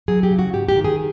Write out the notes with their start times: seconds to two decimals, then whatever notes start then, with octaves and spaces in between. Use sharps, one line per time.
0.08 F#3 G#4
0.23 G4
0.31 C#3
0.39 F#4
0.53 G#2 G4
0.69 G4
0.76 D#3
0.84 G#4